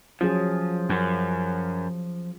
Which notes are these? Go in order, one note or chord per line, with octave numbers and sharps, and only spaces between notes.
F3 F#3 C#4 G#4
F#2